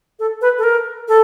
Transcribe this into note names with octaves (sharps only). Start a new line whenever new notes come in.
A4
B4
A4
A#4
A4